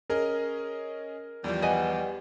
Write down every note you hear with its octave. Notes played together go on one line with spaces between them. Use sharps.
C#4 G#4 A#4 D#5
E2 F3 G3
B4 D#5 F#5 G#5